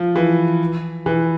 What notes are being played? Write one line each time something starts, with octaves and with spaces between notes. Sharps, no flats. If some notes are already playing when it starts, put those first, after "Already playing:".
Already playing: F3
E3
E3